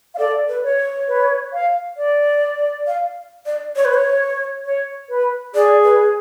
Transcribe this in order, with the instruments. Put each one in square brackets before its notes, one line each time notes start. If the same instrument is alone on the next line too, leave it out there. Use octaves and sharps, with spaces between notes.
[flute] F5
[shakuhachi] A4 [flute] D5
[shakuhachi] B4
[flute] C#5
[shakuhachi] C#5
[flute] B4
F5
D5
[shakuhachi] F5
D5
C#5
B4
C#5
[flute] C#5
B4
[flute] G#4 [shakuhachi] D5
[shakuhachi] B4